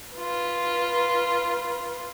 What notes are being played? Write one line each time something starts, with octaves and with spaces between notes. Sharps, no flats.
F4 B4